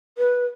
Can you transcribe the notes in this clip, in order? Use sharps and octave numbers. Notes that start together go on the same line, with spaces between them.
B4